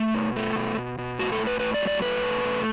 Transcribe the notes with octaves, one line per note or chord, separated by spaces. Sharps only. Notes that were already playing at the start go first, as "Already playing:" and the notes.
Already playing: A3
B2
A3
B2
B2
B2
A2 F#4
A4
A2
B4
A2 B4
D5
F#3
D5
A3 B4
B2
A3